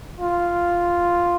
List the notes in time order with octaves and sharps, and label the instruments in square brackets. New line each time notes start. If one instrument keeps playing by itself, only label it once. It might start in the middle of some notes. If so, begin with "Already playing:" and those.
[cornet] F4